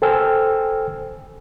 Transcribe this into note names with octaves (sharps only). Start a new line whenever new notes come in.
A4 C5 G5 G#5 E6 F6